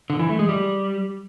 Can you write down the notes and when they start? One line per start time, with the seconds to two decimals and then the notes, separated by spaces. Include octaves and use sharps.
0.10 D3
0.19 E3
0.29 A3
0.39 G#3
0.49 G3